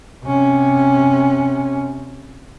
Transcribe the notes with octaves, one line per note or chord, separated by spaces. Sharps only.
C3 C#4